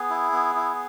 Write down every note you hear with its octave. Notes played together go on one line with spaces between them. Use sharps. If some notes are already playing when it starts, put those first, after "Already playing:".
Already playing: B3 G#4
E4
B3
E4